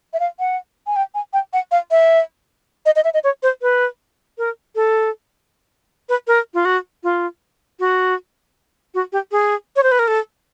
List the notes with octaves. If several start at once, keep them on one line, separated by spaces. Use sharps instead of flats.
E5
F5
F#5
G#5
G5
G#5
G5
F#5
F5
E5
D#5
D#5
E5
D#5
C#5
C5
B4
A#4
A4
B4
A#4
F4
F#4
F4
F#4
F#4
G4
G#4
C#5
C5
B4
A#4
A4